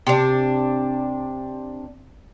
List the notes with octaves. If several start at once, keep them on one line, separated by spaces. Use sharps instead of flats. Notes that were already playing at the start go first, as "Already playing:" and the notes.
C3 D4